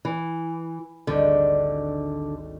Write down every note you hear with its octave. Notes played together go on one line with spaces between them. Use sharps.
E3
G#1 D2 D3 G3